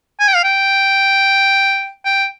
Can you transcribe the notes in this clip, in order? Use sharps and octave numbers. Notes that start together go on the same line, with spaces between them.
G#5
G5
F5
G5
G5